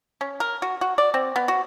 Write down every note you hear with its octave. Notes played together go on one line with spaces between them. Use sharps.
C#4
A#4
F#4
F#4
D5
C4
B3
F#4